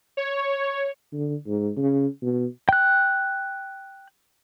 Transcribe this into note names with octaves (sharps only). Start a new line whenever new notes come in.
C#5
D3
G#2
C#3
B2
G5 F#6